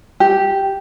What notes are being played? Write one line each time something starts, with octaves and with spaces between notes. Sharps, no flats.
G4